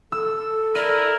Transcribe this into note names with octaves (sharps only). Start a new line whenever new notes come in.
A4 E6
E4 A#4 D5 D#7